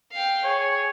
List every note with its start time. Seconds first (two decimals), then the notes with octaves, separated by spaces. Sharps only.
0.12 F5 G5
0.45 G#4 C#5